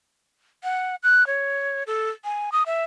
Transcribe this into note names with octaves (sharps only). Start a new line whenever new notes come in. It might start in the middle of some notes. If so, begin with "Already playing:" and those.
F#5
F#6
C#5
A4
G#5
D#6
E5